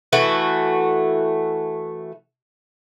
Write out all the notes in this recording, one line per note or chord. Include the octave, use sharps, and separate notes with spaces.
E3 A3 F#4